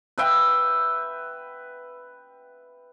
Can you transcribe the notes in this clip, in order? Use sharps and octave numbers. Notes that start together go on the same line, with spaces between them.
B4 E5 G5